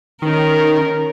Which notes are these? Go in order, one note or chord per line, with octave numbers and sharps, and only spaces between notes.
D#3 C#4 A#4